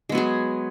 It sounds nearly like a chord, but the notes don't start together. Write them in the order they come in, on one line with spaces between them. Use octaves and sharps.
G#3 B3 F#3 G#4